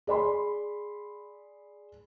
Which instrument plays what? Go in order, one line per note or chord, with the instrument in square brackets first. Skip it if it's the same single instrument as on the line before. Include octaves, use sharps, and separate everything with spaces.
[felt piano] G#4 D5 B5 C6